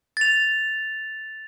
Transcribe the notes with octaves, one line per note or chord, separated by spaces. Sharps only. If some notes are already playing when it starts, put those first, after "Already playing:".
A6 F7